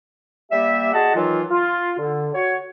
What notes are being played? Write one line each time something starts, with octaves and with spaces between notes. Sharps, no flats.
G3 A#3 G4 E5
F#4 G#4 D#5 F#5 A5
D#3 E3 F#3 F4
F4
D3
F#4 C#5